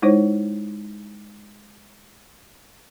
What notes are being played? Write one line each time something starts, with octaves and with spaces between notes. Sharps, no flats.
G#3 D#4 E4 C5 C#5